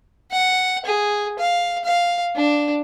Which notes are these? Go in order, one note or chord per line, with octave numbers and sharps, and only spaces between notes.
F#5
G#4
F5
F5
D4